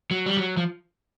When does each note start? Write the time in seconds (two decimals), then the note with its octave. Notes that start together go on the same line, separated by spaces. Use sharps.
0.11 F#3
0.26 G3
0.37 F#3
0.57 F3